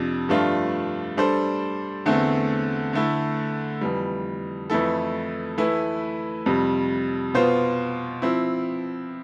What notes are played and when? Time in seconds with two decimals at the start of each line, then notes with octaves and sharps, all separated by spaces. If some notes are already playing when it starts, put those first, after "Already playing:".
Already playing: F2 C3 F3 D4
0.29 G2 F3 A3 D4 F4
1.17 G3 D4 A4 C5
2.06 E2 D3 A3 C4
2.93 D3 A3 E4
3.81 F2 E3 G3
4.70 F2 E3 A3 E4 A4
5.58 E3 A3 E4 B4
6.46 F2 C3 G3
7.34 B2 B3 F4 C5
8.22 F3 C4 E4